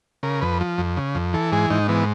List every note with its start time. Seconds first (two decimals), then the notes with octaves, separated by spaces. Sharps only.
0.23 C#3 A#4
0.41 F2 B4
0.61 F3
0.78 F2
0.97 C#3
1.15 F2
1.34 E3 A4
1.52 G#2 G#4
1.70 G#2 D#4
1.89 E3 B3